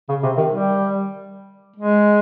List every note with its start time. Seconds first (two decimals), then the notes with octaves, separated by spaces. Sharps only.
0.09 C#3
0.23 C3
0.37 D#3
0.50 G3
1.76 G#3